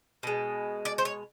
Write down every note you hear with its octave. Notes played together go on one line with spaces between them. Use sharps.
B2 G#3
D5
C5
C#5